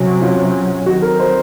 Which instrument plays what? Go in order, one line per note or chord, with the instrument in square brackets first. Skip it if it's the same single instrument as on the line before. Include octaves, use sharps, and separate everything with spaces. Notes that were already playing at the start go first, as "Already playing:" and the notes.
Already playing: [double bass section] C3 F#3 C#4
[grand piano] F4
[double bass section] D#3 F#3 C4 [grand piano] F#4
[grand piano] A#4
C5